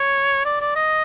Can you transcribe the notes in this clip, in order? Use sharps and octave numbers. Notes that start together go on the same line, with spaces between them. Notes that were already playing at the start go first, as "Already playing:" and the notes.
Already playing: C#5
D5
D5
D#5